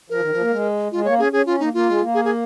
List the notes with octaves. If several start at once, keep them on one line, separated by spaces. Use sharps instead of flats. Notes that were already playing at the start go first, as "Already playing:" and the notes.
F3 A#4
D#3
F3
A#3
G#3
G#3 F4
A#3 C#5
C#4 G#4
C#4 G#4
C#4 F4
A#3 D#4
A#3 F4
G#3
A#3
G#4
G#4